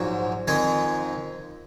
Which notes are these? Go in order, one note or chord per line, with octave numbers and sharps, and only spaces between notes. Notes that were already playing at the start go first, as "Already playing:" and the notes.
Already playing: A#1 G#2 F#3
F2 D#3 G#3 G#4